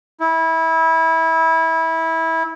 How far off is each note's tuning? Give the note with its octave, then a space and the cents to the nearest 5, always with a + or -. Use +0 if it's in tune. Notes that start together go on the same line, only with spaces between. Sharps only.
E4 -20